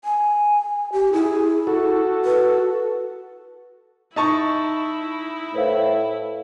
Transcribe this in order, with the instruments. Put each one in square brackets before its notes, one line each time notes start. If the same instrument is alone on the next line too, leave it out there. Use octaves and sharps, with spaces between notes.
[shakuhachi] G#5
G4
[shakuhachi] E4 [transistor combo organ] G#4
[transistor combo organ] F#4 A4
[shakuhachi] B4
[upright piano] D#4 A5 C#6 [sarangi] E4
[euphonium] A2 [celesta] B4 C5 F5